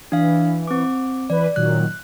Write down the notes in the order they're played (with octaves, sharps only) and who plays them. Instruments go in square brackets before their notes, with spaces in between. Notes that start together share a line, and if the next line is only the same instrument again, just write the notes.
[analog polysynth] E3 [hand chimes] D4 F5
[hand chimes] C4 D6
[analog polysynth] E3 B4 [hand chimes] D5
[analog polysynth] A#2 D#3 F#3 [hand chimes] F#6